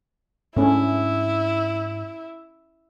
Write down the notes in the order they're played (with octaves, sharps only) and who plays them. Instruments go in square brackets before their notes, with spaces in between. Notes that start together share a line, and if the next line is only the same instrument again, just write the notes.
[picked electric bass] G#2 D4 [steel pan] A3 C#4 [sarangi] E4